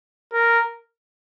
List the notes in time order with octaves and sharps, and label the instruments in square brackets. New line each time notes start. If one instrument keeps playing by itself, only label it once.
[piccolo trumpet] A#4